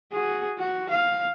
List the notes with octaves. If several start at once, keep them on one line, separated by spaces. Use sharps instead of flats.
F#4 G#4
F#4
F5